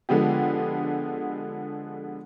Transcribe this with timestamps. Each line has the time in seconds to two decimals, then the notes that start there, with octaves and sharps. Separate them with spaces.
0.09 D3 F3 G#3 B3 G4